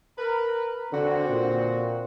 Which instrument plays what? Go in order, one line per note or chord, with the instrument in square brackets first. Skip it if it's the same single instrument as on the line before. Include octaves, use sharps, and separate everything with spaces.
[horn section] A#4 B4
[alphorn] D3 [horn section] C4 F#4
[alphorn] A#2